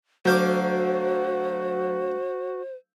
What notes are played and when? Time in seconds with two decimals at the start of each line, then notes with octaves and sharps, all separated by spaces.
0.25 D2 F#3 F#4 C5 F5 D6 G6